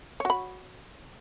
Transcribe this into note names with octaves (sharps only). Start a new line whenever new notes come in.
F#4 C#5 B5